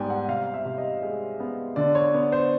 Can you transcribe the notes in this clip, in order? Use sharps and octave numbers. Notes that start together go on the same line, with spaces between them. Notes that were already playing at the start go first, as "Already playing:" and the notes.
Already playing: G#2 G3 B3 G5 G#5
F#5
C3 F5
E5
C3
D#5
G#3
B3
D3 D5
C#5
B3
C5